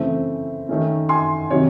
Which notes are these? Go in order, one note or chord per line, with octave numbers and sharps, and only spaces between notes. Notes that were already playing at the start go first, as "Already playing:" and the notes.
Already playing: C#3 E3 A3 C4
D#3 A3 C#4
G#5 C6
C3 D#3 F#3 C#5